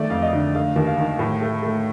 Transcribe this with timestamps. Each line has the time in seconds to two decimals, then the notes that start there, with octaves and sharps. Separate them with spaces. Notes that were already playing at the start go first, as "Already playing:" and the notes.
Already playing: D#3 A3 D5
0.10 F2 F5
0.22 D#5
0.33 D3
0.55 A3 F5
0.76 D#2
0.87 F5
0.98 D#3
1.19 A2
1.41 A3
1.62 A3